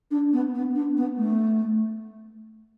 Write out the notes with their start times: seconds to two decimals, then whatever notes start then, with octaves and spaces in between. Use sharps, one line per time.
0.11 D4
0.33 B3
0.55 B3
0.75 D4
0.97 B3
1.18 A3